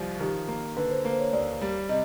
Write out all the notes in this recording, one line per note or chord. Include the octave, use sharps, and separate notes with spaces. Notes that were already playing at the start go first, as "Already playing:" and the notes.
Already playing: C2 F3
D#3 G4
A#3
D3 B4
C5
A#3
C5
C#5
D#2 D5
G3
C3 D#5